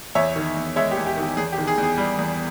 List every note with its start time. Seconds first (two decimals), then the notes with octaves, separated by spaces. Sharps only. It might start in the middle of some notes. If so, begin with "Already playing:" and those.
0.15 E2 C#5 E5
0.36 D#3
0.57 E2
0.76 G#3 C#5 E5
0.91 G4
0.97 E2
1.07 G4
1.17 D#3
1.22 G4
1.37 E2 G#4
1.52 G4
1.58 D#3
1.67 G#4
1.78 E2
1.83 G#4
1.98 G3
2.19 E2